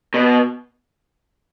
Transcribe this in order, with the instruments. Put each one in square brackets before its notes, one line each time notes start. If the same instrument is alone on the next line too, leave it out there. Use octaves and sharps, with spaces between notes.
[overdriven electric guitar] B2